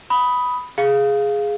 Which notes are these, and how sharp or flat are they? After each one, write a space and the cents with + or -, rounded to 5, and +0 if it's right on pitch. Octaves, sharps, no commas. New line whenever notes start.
B5 +0 D#6 +10
G#4 +0 F5 +0